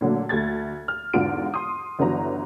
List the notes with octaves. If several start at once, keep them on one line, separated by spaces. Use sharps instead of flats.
A#2 D3 F#3 A3
D2 A3 G#6 A6
F6
E2 G#2 D3 F4 F#4 D7
C6 D#6
G1 D3 E3 F#3 A#5